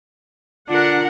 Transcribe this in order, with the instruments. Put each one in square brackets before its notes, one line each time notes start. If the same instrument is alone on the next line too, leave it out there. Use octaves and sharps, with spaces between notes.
[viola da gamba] D3 A#4 [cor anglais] D4 [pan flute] F4 [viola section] F#5